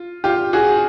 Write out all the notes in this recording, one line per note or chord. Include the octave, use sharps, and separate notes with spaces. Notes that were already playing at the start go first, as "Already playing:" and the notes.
Already playing: F4
F4 G4
F#4 G#4